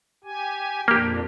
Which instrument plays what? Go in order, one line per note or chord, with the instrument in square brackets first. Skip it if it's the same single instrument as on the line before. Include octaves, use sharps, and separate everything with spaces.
[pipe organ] G4 G#5
[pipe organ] F2 A#2 D4 [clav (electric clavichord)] A#3 G4